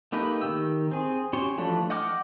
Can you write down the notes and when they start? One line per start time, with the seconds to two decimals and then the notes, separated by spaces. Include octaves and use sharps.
0.12 A3 A#3 D#4 G4 B4
0.41 D#3 G4 E6
0.91 C4 G#4
1.33 C#4 F#4 G4 C#5 C6
1.58 E3 F3 A3 D4
1.90 D#5 F#5 G5 D6 F6